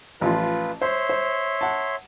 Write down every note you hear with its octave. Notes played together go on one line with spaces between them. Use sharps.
A1 F3 F4 B4
C5 C#5 E5 C6
C5
F#5 A5